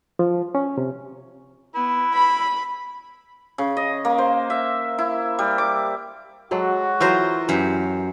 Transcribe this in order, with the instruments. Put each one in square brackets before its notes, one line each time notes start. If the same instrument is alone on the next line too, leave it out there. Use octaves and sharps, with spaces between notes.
[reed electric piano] F3
C#4
C3
[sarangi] B3 [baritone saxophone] E4
[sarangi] B5
[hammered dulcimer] C#3
D#5
A#3
C5
E5
E4
G3
D6
[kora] F#3 G#3 A4 [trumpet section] F#4
[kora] E3 F#3 A3 [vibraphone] E4 [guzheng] F4 C5 A#5
[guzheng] F#2 [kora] E3 G4